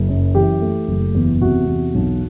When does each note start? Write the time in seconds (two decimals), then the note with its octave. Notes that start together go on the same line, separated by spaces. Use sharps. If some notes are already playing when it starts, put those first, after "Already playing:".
Already playing: F#1
0.09 F#2
0.35 E3 G4
0.61 A3
0.88 F#1
1.15 E2
1.41 C3 F#4
1.67 E2
1.94 B1